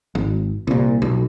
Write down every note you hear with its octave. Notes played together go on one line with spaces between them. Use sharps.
G#1
C2 A#2
B1